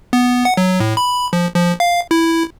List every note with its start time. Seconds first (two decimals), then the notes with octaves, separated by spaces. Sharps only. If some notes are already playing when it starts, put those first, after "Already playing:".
0.13 B3
0.45 F#5
0.57 F#3
0.80 A2
0.97 B5
1.33 F3
1.56 F3
1.80 F5
2.11 E4